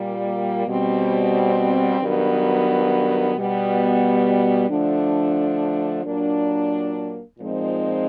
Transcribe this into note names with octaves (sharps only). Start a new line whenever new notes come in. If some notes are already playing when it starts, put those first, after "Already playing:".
Already playing: A#2 G3 A#3
B2 G3 C4
G2 D#3 F#3 B3
B2 G3 B3
D3 F3 A3 D4
A#2 F#3 A#3 D4
A#2 F3 G#3 C4 D#4